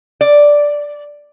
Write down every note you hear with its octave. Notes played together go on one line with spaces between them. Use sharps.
D5